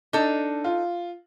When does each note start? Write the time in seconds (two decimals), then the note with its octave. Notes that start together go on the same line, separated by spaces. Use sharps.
0.13 D4 D#4 A4
0.64 F4